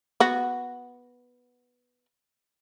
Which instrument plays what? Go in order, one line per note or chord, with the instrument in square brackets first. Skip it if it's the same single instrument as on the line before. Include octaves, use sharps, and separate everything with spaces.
[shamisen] B3 F#4